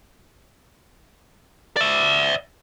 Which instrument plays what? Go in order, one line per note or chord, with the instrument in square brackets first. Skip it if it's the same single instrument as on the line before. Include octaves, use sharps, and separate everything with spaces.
[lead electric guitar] D5 E5